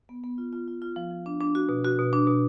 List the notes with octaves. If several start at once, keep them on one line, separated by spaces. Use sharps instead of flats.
B3
B3
F4
F4
F4
F4
F3
F3
D4
D4
F#4
B2
F#4
B2
D4
B2